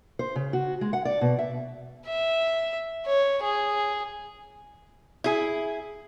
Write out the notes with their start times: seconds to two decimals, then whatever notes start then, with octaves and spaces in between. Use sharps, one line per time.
0.19 C5
0.36 C#3
0.53 F#4
0.81 G#3
0.93 F#5
1.05 D5
1.21 B2
1.39 E5
2.07 E5
3.06 C#5
3.43 G#4
5.24 E4 G#4